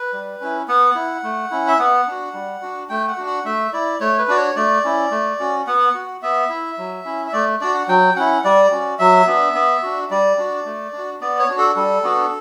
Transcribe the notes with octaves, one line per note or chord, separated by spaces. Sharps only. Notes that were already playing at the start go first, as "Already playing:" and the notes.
Already playing: B4
G3
C#4 E4
B3 F#5
E4
A3
C#4 E4
E5
B3 F#5
D4 F#4
G3
D4 F#4
A3 G5
F#5
D4 F#4
F#5
A3 E5
E4 D5
A3 C#5
B4
D4 F#4 D5
C#5
A3 D5
C#4 E4
A3
C#4 F#4
B3 F#5
F#4
B3 E5
E4
F#3
C#4 E4
E5
A3 D5
D4 F#4 D5
F#5
F#3 G5
C#4 E4 F#5
G3 D5
C#4 F#4
F#3 E5
B3 D4
B3
D4 F#4
G3 D5
D4 F#4
A3
D4
F#4
B3 D5
C#5
D4 F#4
A4
G3 A4
B3 D4 F#4